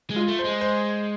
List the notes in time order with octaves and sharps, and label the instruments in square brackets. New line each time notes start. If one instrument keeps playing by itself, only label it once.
[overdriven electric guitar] G#3
[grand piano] F4
[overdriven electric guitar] A3
[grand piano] C5
[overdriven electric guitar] G#3
[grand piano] C5